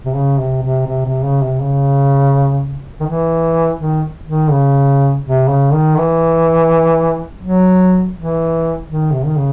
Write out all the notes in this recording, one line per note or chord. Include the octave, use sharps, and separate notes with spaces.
C3
C#3
C3
C3
C3
C3
C#3
C3
C#3
D#3
E3
D#3
D#3
C#3
C3
C#3
D#3
E3
F#3
E3
D#3
C3
D#3
C#3